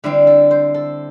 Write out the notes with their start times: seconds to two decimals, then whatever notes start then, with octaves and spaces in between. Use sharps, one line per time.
0.04 D3 G3 C4 E4
0.27 A4
0.51 C5
0.74 A4